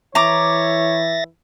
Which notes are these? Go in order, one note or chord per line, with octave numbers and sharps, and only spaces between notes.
E3 E4 C#5 E5 A#5 D6 A6 A#6